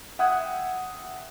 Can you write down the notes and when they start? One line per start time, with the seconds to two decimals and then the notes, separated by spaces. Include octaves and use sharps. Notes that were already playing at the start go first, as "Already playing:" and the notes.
0.19 E5 F#5 G5 D#6 F#6 G#6